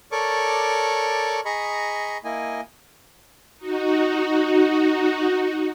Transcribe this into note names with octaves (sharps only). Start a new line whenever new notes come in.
A4 A#4 C#5 D5 C#6 D6
G#4 D#5 A#5 B5 C#6
A#3 E4 D#5 G#5
D#4 F#4